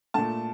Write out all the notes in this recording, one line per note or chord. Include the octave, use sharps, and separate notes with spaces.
A#2 A3 A5